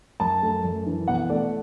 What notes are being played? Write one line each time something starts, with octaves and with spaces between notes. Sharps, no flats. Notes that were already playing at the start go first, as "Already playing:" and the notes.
F#2 A5
A3
F#2
E3
B2 F#5
A3 D5